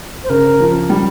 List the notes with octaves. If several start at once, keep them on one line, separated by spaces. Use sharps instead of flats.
C5
C#3 A#4
F3
G3